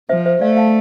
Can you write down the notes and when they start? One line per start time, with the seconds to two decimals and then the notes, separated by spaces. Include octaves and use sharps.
0.09 F3 C5 E5
0.26 C5 E5
0.41 A3 D5 F5
0.57 F5 A5